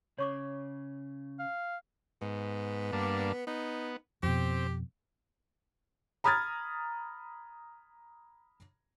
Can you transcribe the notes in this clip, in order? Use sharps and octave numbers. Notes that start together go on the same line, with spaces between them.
C#3 C#5 C#6 D6
F5
G#2 B3
G2 A#3 D4
B3 D#4
F2 B2 C4 G4
A#5 B5 D#6 F6 G#6 A6